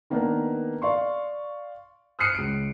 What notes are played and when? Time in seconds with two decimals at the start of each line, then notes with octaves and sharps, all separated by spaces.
0.10 D#3 A#3 B3 D4 A#4 B4
0.82 D5 F5 C6 C#6
2.19 D#6 F6 F#6 C7 C#7 D#7
2.35 C#2 D7